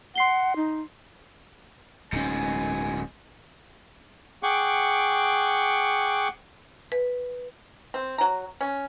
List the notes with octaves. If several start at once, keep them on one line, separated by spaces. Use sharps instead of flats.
F#5 C6 C7 G7
D#4
D1 G#2 B2 C#4 G#5
G#4 F#5 G5 C#6 D6
B4
C4
F#3 A#5
C#4